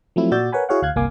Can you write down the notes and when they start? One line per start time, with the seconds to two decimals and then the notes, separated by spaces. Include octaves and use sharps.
0.16 F3 F#3 A3 C4 E4
0.31 A#2 F#4 D5 E6 G6 A6
0.52 A#4 B4 C#5 F#5 G#5 B5
0.69 E4 F#4 G#4 C#5 F5 F#5
0.82 D2 F5 F#6 G#6
0.96 G1 C2 A#3 F5 G#5 D6